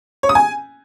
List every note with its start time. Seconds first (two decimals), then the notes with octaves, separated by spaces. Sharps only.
0.23 C#5
0.29 D#6
0.35 G#5